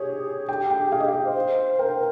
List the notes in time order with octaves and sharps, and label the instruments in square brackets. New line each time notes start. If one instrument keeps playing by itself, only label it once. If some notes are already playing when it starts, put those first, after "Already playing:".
Already playing: [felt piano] G4 C#5 [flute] G#4
[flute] G4 [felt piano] G5
[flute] G4
[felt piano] G5
[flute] G#4
G4
[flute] G#4 [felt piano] F5
[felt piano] D#5
[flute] G4 [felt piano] F5
[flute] C5
[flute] A#4 [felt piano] G5